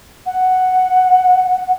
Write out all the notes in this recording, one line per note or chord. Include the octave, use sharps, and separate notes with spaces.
F#5